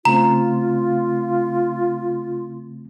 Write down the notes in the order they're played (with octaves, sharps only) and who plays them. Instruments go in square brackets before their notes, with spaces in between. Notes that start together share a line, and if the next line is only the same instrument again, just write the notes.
[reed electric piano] C#3 A3 C4 [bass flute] F4 [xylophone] A#5